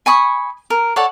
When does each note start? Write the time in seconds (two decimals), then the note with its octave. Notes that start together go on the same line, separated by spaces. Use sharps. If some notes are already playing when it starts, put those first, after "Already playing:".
0.06 G#5 B5 C#6 D#6
0.70 A#4
0.96 A4 C#5 D5 F#5